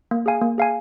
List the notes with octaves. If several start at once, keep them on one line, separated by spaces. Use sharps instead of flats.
A#3
G#4 F5 G#5
A#3
G#4 F5 G#5